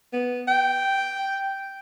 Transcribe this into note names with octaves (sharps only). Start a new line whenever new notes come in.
B3
G5